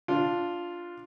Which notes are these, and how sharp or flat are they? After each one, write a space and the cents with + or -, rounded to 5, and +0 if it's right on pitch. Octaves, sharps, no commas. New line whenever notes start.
D4 +0 F4 +0